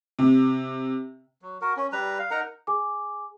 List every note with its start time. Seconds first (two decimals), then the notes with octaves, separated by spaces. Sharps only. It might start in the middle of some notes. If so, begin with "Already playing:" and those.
0.19 C3
1.42 F#3
1.61 F#4 A#4
1.77 C#4
1.92 G3 B4 A#5
2.19 F5
2.31 D#4 A#4 F#5 A#5
2.67 G#4 G#5 D6